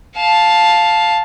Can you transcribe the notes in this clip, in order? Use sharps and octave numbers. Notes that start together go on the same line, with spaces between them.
F5 A5